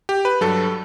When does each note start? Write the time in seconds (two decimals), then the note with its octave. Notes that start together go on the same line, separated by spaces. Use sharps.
0.09 G4
0.25 B4
0.41 G2 F#3 A4